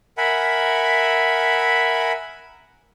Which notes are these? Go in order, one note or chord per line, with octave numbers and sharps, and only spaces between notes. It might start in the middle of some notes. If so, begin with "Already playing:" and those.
A#4 E5 F#5 G#5 B5